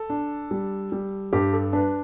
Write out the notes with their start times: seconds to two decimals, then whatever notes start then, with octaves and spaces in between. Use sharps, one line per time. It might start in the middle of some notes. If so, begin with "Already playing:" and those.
Already playing: A4
0.10 D4
0.51 G3
0.92 G3
1.33 G2 G4
1.53 A4
1.73 D4 B4